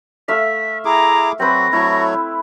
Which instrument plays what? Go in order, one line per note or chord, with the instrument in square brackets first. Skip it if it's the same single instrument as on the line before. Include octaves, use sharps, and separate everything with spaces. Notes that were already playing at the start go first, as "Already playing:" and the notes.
[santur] A3 E5 F5 [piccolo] B6
[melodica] E4 G#4 D6 [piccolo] A#5
[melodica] F#3 F#4 [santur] C4 B4 [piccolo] A#6
[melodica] F#3 A3 C#5 [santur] E4